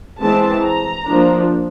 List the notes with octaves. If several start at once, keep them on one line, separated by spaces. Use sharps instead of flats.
E3 G#3 C4 A5
A#5
F3 A#3 D4